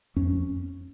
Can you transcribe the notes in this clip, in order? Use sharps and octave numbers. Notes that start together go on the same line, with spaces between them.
F2 C#4